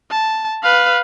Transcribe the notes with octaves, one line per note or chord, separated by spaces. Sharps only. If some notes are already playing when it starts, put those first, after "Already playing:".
A5
B4 F5